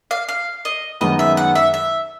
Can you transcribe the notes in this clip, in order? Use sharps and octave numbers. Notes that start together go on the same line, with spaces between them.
F5
F5
D#5
F#2 D#3 G#3 B3 D#5
E5
F#5
E5
E5